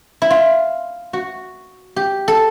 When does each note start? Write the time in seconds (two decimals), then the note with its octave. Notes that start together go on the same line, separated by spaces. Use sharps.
0.22 E4
0.30 F4
1.13 F#4
1.96 G4
2.28 A4